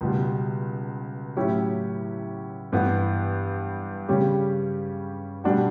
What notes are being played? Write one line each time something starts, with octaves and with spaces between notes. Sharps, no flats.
C#2 B2 G3
A2 F#3 C#4 E4 G4
G2 E3 B3
C#3 G3 C#4 G4
B2 G3 D4 F#4